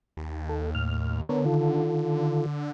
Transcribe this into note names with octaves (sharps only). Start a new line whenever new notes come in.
D#2
A4
A2 F6
D3 B3 A#4 C#5
D#3 F4 A4